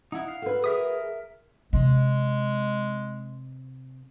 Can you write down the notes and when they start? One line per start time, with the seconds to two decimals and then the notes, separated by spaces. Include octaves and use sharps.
0.12 D#4 E4 F#5
0.28 F5
0.42 F#4 A4 B4
0.64 G#4 A#4 E5 D#6
1.73 C3 G#3